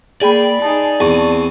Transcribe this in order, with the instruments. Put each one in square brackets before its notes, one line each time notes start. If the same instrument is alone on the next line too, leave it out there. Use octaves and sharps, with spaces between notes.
[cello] A#3 [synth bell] G#4 G5 B5 [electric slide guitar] D5
[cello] D#4 G#4 [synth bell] A5
[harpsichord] E2 [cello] C4 [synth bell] A5 C#6 D#7